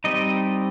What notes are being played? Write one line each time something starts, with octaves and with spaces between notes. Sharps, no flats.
G3 C4 D#4 D#5